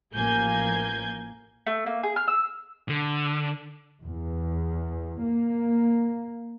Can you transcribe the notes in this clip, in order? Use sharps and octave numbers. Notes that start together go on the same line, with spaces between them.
A1 F3 A#3 G#5 G6 G#6
A3
A#3
G#4
F6
E6
D3
E2
A#3